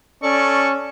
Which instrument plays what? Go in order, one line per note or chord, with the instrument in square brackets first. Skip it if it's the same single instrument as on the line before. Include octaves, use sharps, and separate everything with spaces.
[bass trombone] C#4 [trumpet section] A4 D5 C#6